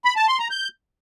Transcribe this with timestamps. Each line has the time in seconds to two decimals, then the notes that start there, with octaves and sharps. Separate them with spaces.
0.05 B5
0.16 A5
0.28 C6
0.39 A#5
0.51 G6